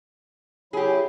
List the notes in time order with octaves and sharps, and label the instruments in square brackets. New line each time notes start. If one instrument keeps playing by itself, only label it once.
[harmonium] F#3 E4 [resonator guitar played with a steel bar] G4 G#4